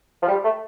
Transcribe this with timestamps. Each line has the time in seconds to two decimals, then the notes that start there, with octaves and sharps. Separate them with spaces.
0.22 F3
0.27 G3
0.44 A3